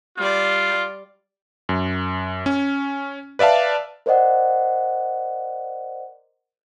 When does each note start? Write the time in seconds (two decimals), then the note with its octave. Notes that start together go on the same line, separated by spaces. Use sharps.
0.18 G3 F4 D5
1.69 F#2
2.46 C#4
3.39 B4 D5 E5 F5 A5
4.06 A#4 C5 D5 D#5 F#5